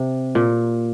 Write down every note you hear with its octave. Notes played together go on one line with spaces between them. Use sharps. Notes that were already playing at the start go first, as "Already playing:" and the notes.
Already playing: C3
A#2